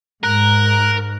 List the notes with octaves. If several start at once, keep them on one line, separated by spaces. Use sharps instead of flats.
G#2 A#4 F#6